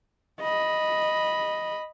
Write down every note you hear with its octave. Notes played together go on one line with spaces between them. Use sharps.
D#5 B5